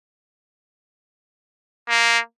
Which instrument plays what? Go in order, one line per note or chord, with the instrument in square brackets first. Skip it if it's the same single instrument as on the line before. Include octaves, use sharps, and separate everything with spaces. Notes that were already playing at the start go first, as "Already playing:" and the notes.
[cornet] A#3